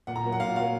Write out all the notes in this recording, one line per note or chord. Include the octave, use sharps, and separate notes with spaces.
A#2 F#5
A#5
F#3 A#3
F#5
A#2 F5
F#3 A#3 F5